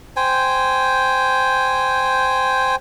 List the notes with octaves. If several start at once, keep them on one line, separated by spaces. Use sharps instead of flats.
C5 G5 G#5